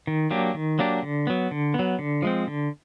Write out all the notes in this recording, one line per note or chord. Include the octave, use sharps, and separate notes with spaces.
D#3
F#3 A#3 D4 G4
D#3
F#3 A#3 D4 G4
D3
F#3 B3
D3
B3
F#3
D3
F3 G#3 C4
D3